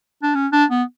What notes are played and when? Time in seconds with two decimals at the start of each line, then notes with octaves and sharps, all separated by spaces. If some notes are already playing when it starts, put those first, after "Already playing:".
0.23 D4
0.35 C#4
0.52 D4
0.70 B3